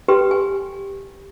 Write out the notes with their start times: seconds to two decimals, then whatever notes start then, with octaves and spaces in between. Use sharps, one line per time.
0.08 G4 A4 B4 G5 C6
0.31 G#5